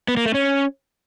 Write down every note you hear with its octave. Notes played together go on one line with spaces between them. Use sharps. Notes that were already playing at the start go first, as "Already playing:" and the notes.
B3
A#3
A3
C#4